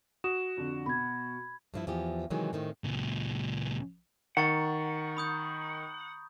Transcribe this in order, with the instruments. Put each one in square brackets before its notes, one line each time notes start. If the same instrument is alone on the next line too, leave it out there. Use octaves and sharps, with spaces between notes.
[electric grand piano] F#4 [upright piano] D#6 [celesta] E7
[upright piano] F2 D3
[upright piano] B2 [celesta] B5 G#6
[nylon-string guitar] G2 F3 E4
E2 F3 B3 G4
C3 D#3 E3 F#3 G#3
A2 D#3 C4
[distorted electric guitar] C#2 A#2
[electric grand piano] D#3 [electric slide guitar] F#5 [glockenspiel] A#5 C#6 A6
[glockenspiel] B5 D#6 G6